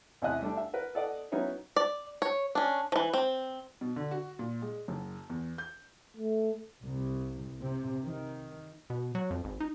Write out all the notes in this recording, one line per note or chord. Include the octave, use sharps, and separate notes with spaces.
A1 E2 C3 E4 D#5 F#6
G3 A3 D4
E5
A#4 B4 F#5
A4 D5 D#5 F#5
F#3 B3 C#4 D#4 E4 C#5
D5
C#5
C#4 D4
E3 F3
C4
B2
D3
F#4
A#2
G#3
F#1
E2
G6
A3
C2
C3
D#3
B2
F#3
F2
G#1
D#4